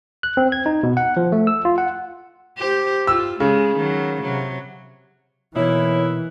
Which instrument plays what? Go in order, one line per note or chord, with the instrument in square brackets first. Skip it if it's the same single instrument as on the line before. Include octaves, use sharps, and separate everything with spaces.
[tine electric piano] F#6
C4
G#6
D#4
B2
F#5
F3
A3
E6
F4
F#5
[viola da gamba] G4 C5
[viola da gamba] F4 [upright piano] E6
[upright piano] C#3 [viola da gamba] G#3
[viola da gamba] D#3 F#3
C3 F#3
[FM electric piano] B2 [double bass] E3 [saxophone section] A#3 D#4 E4 [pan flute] C#5